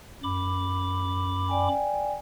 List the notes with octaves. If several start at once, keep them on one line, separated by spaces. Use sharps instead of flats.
F#2 B5 D6
D5 G5 G#5